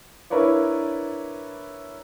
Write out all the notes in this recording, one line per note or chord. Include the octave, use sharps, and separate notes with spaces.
D4 E4 A#4 B4 C#5 D5